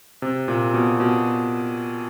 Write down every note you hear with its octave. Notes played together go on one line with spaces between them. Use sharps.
C3
A#2
B2
B2